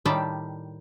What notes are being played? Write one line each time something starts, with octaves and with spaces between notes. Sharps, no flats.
A2 D#3 G3 D5 G5 A5